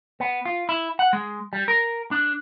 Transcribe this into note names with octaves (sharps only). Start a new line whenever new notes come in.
B3
F4
E4
F#5
G#3
G3
A#4
D4